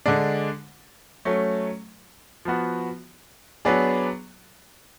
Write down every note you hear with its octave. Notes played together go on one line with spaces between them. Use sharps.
D3 G#3 D4
F#3 A3 C#4
F3 B3 F#4
F#3 B3 D4 G#4